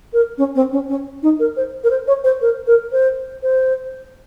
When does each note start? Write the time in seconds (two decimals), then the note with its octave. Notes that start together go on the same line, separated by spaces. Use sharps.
0.13 A#4
0.37 C#4
0.55 C4
0.71 C#4
0.88 C#4
1.22 D#4
1.39 A#4
1.56 C5
1.83 A#4
1.90 C5
2.07 C#5
2.24 C5
2.41 A#4
2.66 A#4
2.92 C5
3.42 C5